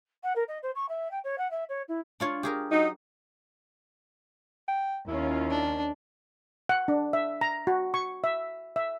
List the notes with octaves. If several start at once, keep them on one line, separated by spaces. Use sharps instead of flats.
F#5
A#4
D#5
C5
C#6
E5
G5
C#5
F#5
E5
C#5
E4
D4 F4 C#5
G4 G#4 A#4
F#3 D#4
G5
D#2 C#4 E4 F4
D4
F#5
D4
E5
A#5
F#4
C#6
E5
E5